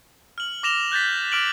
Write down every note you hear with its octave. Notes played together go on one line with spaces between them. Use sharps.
F6 F#7
D6 A#6 E7 F7 G7
F#6 G6 A6 B6
D6 F6 D7 F#7